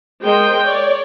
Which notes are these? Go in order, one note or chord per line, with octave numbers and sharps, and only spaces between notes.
G#3 A#4 C5 D#5 G5
C#5 D5